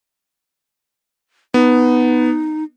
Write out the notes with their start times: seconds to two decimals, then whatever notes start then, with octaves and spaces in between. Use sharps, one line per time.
1.54 B3 D#4